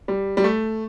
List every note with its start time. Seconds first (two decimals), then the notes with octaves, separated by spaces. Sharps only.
0.08 G3
0.37 G3
0.44 A3